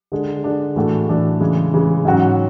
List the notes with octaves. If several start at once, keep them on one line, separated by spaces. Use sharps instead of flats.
D3 G#3 D4
D3 G#3 D4
A2 E3 A3 D4 F#4
A2 E3 A3 D4 F#4
C#3 E3 G#3
C#3 E3 G#3
G#2 F#3 C#4 F#4